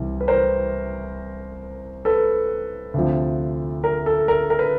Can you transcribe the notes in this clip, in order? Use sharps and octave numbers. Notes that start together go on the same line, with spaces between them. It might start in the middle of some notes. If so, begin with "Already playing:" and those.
Already playing: C2 C3 E3
B4
A#4 C5
A4 B4
D2 C3 F3
A#4
A4
A#4
A#4
B4